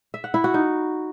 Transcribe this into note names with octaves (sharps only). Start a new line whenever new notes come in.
E5
F#5
E4
F#4
D#4